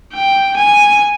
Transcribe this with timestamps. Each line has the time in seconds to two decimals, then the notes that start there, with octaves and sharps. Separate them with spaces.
0.14 G5
0.57 G#5